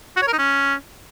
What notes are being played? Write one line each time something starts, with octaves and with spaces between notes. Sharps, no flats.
F#4
C#5
A#4
D#4
C#4